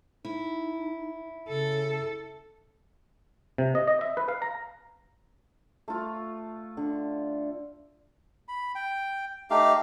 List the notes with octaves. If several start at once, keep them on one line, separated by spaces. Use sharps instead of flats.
D#4 E4
C#3 A4
C3
D#5
D#5
E5
B4
F5
A#5
A3 F4
D3
B5
G5
A3 D#4 G4 F5